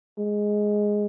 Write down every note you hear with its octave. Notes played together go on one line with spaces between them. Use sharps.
G#3